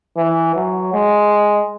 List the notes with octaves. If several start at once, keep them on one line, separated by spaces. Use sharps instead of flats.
E3
F#3
G#3